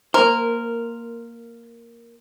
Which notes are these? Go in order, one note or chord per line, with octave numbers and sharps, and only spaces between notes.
A#3 A#4 C5